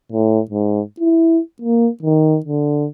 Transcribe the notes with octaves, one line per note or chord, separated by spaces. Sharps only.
A2
G#2
E4
A#3
D#3
D3